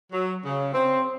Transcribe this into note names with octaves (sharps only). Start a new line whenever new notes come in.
F#3
C#3
C4